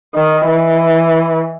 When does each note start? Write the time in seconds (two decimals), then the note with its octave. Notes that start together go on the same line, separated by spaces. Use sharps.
0.14 D#3
0.47 E3